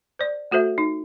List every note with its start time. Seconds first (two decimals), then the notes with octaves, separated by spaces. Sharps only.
0.19 C5 D5
0.51 A3 F#4 A4 C5 E5
0.78 D#4